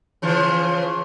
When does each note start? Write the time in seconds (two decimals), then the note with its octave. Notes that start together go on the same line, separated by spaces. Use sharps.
0.22 C#3 E3 F3